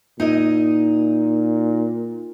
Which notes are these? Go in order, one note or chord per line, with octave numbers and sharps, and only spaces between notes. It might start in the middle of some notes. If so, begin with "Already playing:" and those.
A#2 D#4 E4 D#5